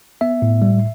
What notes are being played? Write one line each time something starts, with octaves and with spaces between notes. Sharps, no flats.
B3 E5
A2
G3